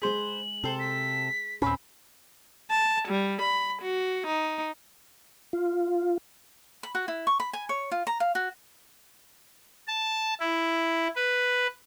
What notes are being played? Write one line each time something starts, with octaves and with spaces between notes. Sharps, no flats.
G#3 G#4 B4 C5 F#7
C3 A4 C5
B6
D#2 A#2 C4 C#4 B4 B5
A5
G3
B5
F#4
D#4
F4
B5
F#4
E4
C#6
B5
G#5
C#5
F4
A#5
F5
F#4
A5
E4
B4